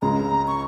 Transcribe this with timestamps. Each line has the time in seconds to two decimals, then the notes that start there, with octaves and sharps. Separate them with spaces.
0.02 C#2 C#3 G#3 A#5
0.47 C#6